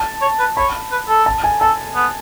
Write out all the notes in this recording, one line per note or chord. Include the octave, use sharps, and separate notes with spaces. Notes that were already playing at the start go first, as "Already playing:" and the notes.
Already playing: A5
C#5
B4
C#5 B5
B4
A4
A5
G#5
A4 A5
B3